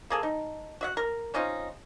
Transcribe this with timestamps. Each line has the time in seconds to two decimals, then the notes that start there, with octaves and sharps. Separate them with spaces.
0.10 A#3 G#4 A4
0.23 D#4
0.81 F#4 E5 F#5
0.97 A#4
1.34 C4 C#4 D#4 F4